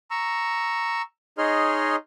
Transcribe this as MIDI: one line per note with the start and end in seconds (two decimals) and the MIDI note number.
0.11 1.02 82
0.11 1.02 85
0.11 1.02 88
1.38 1.96 63
1.38 1.96 68
1.38 1.96 73
1.38 1.96 75
1.38 1.96 84
1.38 1.96 89